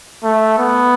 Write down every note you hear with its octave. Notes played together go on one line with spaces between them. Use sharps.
A3
B3